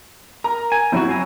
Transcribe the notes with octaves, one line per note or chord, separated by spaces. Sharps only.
A#4 A#5
G#5
F#3 C4 E4 F#4
C4 G#5 A#5